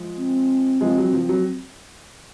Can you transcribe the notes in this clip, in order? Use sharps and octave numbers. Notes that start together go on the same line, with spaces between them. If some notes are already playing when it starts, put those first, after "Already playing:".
Already playing: F3 G#3
C4
F3 G#3
F#3
F3
F#3